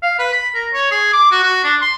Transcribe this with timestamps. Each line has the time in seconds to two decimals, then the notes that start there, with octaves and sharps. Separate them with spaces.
0.03 F5
0.19 B4
0.33 B5
0.55 A#4
0.73 C#5
0.91 G#4
1.13 D6
1.31 F#4
1.43 F#4
1.64 D4
1.81 C6